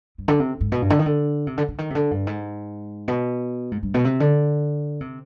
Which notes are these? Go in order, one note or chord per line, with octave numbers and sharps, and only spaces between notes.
G2
D3
C3
G#2
B2
G2
D3
D#3
D3
C3
D3
D3
D#3
C3
D3
G2
G#2
B2
G#2
G2
B2
C3
D3
C3